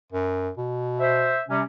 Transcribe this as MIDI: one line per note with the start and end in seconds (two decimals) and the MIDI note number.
0.13 0.50 42
0.57 1.39 47
1.00 1.40 72
1.00 1.40 76
1.49 1.61 48
1.49 1.61 55
1.49 1.61 61